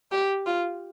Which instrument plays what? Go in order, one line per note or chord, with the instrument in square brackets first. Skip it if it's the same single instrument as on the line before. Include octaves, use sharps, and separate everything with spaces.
[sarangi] G4
F4